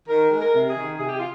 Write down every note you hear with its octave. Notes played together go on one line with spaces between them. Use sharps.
D#3 A#4
G#3
A#4
C3
G#4
D#3
C3 G#4
G4
F4